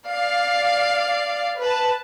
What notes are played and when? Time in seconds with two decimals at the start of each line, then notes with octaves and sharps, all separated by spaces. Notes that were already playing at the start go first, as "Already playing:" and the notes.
0.10 D5 F5
1.61 B4 A5